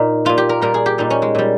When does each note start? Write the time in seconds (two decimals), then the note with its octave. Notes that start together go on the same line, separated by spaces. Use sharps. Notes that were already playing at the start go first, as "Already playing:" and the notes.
Already playing: A#2 D#4
0.25 A#2 G3 F4
0.38 G4
0.49 A#4
0.61 A#2 G3 A#4
0.74 G#4
0.86 G4
0.98 A#2 G3 D#4
1.10 C#4
1.22 G#3
1.35 A#2 G3